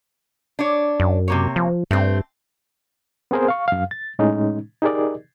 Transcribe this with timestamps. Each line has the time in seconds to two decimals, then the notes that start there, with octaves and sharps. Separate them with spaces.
0.59 D4 C#5
1.00 F#2
1.28 C3 A#3 C#5
1.56 F3
1.91 G2 A3 C4
3.31 B3 C4 G#4 A#4 C5
3.48 F5 C#6
3.68 F#2 F5
3.91 A6
4.19 A2 G#3 C#4 D#4
4.82 D#4 G4 G#4 A#4 D5 D#5